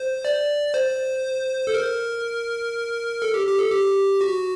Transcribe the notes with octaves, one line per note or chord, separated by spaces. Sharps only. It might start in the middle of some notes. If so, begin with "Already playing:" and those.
Already playing: C5
D5
C5
A4
A#4
A4
G4
G4
A4
G4
F#4